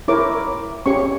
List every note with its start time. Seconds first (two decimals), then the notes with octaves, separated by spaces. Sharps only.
0.08 E4 A#4 C#5 D6
0.86 C#4 G4 C#5 C#6